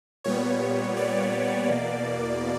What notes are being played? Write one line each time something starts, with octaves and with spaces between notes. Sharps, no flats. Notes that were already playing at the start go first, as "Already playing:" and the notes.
A#2 G3 B3 C#5
D5
E2 B2 A#3